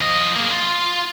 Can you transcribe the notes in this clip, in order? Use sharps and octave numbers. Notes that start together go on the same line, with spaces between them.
F3 D#5
A#3 G#4
F4